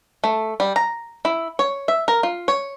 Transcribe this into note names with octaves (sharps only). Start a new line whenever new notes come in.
A3
G3
A#5
E4
C#5
E5
A#4
F4
C#5